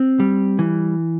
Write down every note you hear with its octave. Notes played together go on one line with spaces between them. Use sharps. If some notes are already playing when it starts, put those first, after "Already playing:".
Already playing: C4
G3
E3